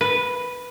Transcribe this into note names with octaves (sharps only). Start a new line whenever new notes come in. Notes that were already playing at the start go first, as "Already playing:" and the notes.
B4